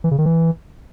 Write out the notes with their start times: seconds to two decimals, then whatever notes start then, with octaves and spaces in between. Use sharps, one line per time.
0.04 E3
0.11 C#3
0.18 D#3
0.26 E3